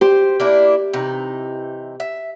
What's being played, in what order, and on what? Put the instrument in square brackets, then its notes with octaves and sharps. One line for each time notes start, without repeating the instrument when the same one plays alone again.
[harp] G4 [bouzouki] C5
[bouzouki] A#3 D4 E4
C3 E3 D#4
E5